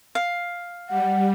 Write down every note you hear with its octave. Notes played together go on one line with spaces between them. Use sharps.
F5
G3 F#5